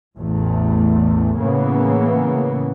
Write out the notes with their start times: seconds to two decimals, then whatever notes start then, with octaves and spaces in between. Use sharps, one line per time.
0.17 A1 E2 A3
1.39 A2 C#3 E3 A#3 B3